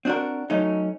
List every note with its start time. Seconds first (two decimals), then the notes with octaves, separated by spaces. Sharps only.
0.05 C4 D4 F4 F#4 A#4
0.50 F#3 A3 C#4 D#4